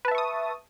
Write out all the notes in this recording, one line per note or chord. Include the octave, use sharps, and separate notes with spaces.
B4 E5 A5 C#6 D#6